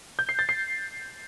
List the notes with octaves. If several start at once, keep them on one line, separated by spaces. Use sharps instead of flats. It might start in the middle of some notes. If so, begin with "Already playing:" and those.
G6
C7
A6
C7